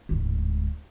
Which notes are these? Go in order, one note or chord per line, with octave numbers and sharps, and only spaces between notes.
D1 G#2